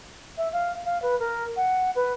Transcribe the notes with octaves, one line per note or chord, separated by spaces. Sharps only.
E5
F5
F5
B4
A#4
F#5
B4